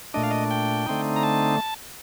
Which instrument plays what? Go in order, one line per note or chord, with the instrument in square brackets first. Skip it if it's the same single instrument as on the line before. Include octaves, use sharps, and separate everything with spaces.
[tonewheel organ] A#2 A3 D4 D#5
F5
D#5
G5
D3 A3 C4 D#4
A#5
A5